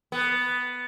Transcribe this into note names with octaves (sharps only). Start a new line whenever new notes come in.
B3